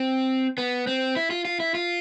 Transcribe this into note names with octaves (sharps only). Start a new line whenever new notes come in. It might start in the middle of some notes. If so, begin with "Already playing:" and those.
Already playing: C4
B3
C4
E4
F4
F4
E4
F4